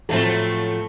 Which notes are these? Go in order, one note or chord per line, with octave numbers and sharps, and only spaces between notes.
A2 F3 F#3 A3 C4 A4